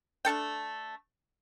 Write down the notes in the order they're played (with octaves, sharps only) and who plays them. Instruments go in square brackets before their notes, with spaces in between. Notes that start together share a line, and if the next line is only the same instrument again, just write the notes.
[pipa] A3 D4 A4 G5